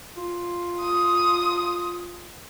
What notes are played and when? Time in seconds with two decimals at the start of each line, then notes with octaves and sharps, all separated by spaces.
0.17 F4
0.81 D#6